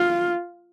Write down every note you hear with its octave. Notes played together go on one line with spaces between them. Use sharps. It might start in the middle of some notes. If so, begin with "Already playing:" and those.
Already playing: F4